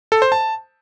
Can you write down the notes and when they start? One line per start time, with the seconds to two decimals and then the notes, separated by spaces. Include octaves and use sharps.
0.12 A4
0.22 C5
0.32 A5